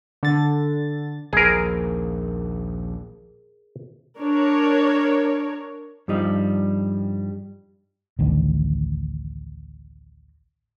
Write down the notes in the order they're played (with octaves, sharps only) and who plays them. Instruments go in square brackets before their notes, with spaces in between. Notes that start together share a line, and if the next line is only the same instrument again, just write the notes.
[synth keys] D3 A6
[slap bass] A#1 D#2 [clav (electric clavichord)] G#4 A#4
[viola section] D4 A#4 C#5
[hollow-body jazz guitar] G2 F3 G3 D#4
[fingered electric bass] A1 D2 D#3